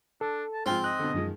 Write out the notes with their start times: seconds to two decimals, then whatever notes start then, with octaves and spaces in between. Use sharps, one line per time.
0.21 D4 A4
0.54 A5
0.66 G#2 F3 C4 F4
0.84 D#5 F#6
0.99 B2 D3
1.14 F#2 D#3 F3 G#3